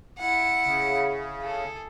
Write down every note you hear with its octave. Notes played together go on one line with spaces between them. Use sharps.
E4 F#5
C#3
G#4 A4